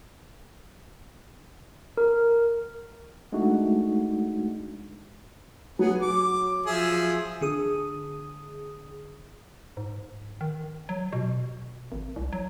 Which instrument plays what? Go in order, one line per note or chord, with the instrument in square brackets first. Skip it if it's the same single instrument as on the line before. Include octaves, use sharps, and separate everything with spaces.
[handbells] A#4
[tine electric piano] G#3 A3 D4 D#4 F#4
[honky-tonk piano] F#3 [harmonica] B3 G#4
[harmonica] D6
F3 G#4 E5
[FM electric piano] D3 G#4 D#6
[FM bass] G#2
D#3
F#3
B2
G#1
C2
F#3